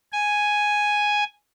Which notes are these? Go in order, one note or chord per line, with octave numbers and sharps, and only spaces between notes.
G#5